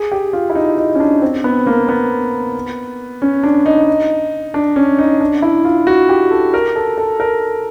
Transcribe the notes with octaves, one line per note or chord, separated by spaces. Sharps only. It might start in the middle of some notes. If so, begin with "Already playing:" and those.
Already playing: G#4
G4
F4
E4
D#4
D#4
C#4
D4
C4
B3
A#3
B3
C#4
D4
D#4
D4
C#4
D#4
D4
E4
F4
F#4
G4
A4
A#4
A4
A4
A#4